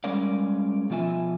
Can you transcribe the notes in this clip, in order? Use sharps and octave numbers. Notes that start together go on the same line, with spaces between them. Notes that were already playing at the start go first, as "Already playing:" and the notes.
G3 G#3 C#4 A#4 D5 F5
B2 F3 F4 E5 G#5